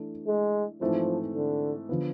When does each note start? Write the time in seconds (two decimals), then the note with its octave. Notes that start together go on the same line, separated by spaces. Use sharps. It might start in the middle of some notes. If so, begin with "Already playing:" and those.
Already playing: E3 A3 D4 A4
0.27 G#3
0.80 G#2 E3 F3 A3 C4
1.34 D3
1.89 D3 F3 B3